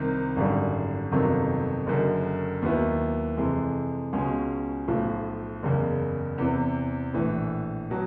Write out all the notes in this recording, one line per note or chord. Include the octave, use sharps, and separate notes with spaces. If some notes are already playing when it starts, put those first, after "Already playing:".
Already playing: C2 C3 D#3
G#1 F#2 D3 G3
G1 F2 C3 D#3 F#3
F#1 F#2 D3
D#2 D#3 F#3 B3 E4
F2 C3 E3 G#3
C#2 B2 G#3 C#4
B1 A2 F3
F#1 E2 C#3
E2 C3 E3
A#1 A2 E3
B2 F#3